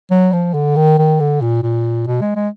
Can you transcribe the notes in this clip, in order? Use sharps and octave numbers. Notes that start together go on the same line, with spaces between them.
F#3
F3
D3
D#3
D#3
D3
A#2
A#2
B2
G#3
G#3